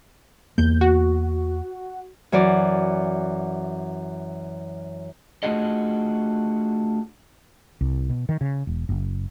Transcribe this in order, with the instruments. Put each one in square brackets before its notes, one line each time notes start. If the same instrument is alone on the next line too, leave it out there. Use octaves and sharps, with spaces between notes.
[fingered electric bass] E2 A#3 [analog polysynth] G6
[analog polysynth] F#4
[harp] F#2 E3 F#4 D5
[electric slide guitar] A3 D4 F4 F#4 G#4 D#5
[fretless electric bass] C2
B2
D#3
C#3
E1
F#1